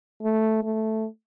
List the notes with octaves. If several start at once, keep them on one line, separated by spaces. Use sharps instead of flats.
A3
A3